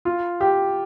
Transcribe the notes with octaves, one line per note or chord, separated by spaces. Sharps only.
F4
G4